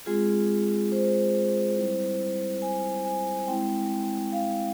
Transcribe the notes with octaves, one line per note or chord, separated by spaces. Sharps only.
G#3 C4 F4 G#4
C5
G3 C4 E4
G#5
G#5
G#3 C4 E4 G5
F5